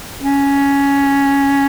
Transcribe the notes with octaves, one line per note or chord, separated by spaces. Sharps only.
C#4